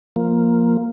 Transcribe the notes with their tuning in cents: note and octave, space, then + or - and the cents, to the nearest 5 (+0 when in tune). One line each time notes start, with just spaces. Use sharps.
F3 +0 A#3 +0